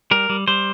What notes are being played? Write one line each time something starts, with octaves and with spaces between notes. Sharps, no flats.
G3 A#4
G3
G3 C5